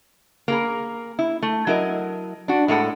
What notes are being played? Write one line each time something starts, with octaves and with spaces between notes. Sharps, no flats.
A#3 G#4 A#4
E4
A3
F#3 E4 A#4 D#5
D4 F#4
A2 G#3 A4 F#5